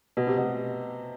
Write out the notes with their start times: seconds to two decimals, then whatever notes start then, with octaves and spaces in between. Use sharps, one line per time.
0.17 B2
0.27 C3
0.38 B2